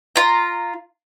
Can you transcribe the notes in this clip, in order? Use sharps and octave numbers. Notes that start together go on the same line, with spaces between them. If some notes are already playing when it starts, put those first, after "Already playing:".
F4 A#5